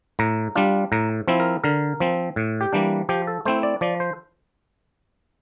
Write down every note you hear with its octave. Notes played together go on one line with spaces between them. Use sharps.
A2 A#5
G3 D4 F4
A2 A#5
F3 C4 E4
A#4
D3 A#4
F3 C4
A2
G4
E3 G3 A#3 D4
F3 G4
A4
A3 C4 E4 C5
D5
F3 D5
C5